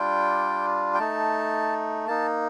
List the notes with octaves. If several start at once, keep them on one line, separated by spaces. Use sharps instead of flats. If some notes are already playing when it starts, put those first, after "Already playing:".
Already playing: G3 D4 F4 G5
G5
A3 D#4 A5
A#3 D#4 A5